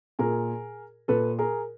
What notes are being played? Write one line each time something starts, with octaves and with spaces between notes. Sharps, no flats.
A#2 G#4 A#4
A#2 A4 B4
G#4 A#4